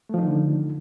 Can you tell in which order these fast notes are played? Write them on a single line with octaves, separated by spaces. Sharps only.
A3 F3 D#4 D#3 D3